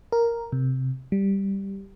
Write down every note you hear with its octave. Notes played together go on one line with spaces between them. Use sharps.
A#4
C3
G3